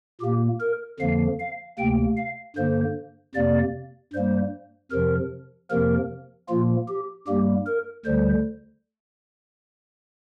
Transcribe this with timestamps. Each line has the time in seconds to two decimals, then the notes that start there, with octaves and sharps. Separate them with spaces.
0.21 A#2 A#3 G4
0.61 A#4
1.00 F2 D3 F3 A#3 F5
1.40 F5
1.78 D2 C3 A#3 G5
2.17 F5
2.56 G2 D3 A#3 C5
3.35 F2 C3 A#3 D5
4.13 G2 G3 A#3 C5
4.91 F2 C3 F3 A#4
5.71 F2 C3 F3 A#3 A#4
6.49 A#2 F3 A#3 F4
6.88 G4
7.27 G2 G3 A#3 G4
7.67 A#4
8.05 D2 D3 G3 C5